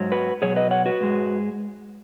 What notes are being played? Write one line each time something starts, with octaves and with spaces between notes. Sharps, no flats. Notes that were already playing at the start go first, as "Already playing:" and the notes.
Already playing: G#2 F#3
F#4 B4
B2 F#3 G#4 C#5
B4 D#5
C#5 F#5
F#4 B4
G#2 G#3